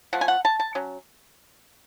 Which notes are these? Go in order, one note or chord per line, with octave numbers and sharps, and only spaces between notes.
F3 A3 F#5
G#5
F#5
A5
A5
F#3 C#4